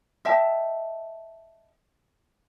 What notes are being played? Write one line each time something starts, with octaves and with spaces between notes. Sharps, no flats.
D#5 E5 G5 A5